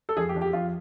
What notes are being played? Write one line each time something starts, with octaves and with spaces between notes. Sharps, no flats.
A4
F2 G#4
G4
F2
G4
F2 F4